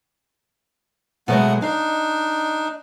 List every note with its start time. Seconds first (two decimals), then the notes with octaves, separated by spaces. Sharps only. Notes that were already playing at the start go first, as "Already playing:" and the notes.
1.28 B2 F#3 G#3 A3 B3 F#5
1.62 D4 D#4 F5